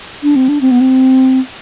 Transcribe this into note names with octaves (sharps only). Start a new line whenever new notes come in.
D4
C4
D4
C4
B3
C4